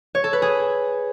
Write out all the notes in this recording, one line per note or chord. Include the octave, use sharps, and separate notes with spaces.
C#5
A4
B4
G#4